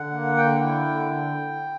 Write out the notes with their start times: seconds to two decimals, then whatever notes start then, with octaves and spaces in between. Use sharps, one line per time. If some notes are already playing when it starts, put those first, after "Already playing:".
Already playing: D3 F#5
0.11 A#3
0.37 D3 G5
0.62 E4
0.86 D3